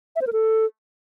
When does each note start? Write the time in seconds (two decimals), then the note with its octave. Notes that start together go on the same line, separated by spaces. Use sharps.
0.16 E5
0.21 C5
0.27 A#4
0.33 A4